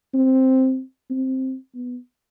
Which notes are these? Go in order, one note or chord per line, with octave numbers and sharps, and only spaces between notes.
C4
C4
B3